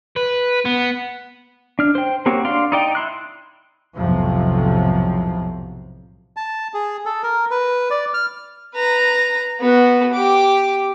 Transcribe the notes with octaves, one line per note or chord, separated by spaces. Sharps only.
B4
B3
D4 F6
C5 G5
A#3 C4 F#4 G4 C#5
D4 D5 F5 C6
D#4 D5 G5
E4 C6 F#6
B1 F2 A2 C3 F3 F#3
A5
G#4
A4
A#4
B4
D5
F6
B4 A#5
B3 F#4
G4 D6